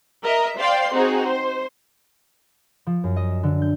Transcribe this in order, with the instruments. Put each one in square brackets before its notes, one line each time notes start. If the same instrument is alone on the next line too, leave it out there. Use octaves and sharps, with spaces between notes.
[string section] A#4 D#5 E5
C5 D5 F5 G5 C6
C4 D#4 F#4 G#4
C5
[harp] F3
F#2
D#5
E7
D3
G6